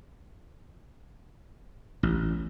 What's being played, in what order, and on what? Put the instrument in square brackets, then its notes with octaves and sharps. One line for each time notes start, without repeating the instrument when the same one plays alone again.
[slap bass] A1